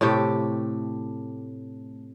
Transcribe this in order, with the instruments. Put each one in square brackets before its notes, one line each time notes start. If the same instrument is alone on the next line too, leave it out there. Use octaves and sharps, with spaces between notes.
[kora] A2 C3 A3 G4